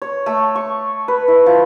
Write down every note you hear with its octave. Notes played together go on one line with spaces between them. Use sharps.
C#5
A3
C#6
B4
E4
F3